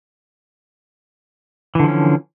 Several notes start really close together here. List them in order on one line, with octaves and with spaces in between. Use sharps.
E3 D3 F3 C#4